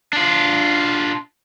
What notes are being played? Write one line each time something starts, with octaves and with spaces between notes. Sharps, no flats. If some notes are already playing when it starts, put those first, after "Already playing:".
D4 F4